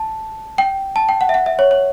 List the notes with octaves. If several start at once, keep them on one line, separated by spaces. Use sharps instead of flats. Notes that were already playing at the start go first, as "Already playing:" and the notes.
Already playing: A5
G5
A5
G5
F#5
E5
F#5
E5
C#5
C#5